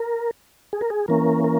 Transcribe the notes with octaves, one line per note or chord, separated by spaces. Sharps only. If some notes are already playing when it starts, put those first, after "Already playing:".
Already playing: A#4
G#4
A#4
G#4
E3 A#3 C#4 A#4
A#4